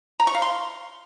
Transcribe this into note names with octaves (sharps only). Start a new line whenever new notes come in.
A#5
C#6
F5
C6